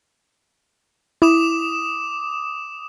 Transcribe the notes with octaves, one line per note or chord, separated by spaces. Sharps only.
E4 D6 D#6 E7